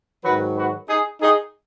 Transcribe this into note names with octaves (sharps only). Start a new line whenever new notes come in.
G#2 D#3 F#3 F#4 B4
F#4 B4
D#4 G#4
D#4 G#4